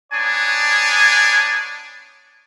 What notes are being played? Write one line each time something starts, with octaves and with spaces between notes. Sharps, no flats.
B3 D4 D#4 C#5 G#5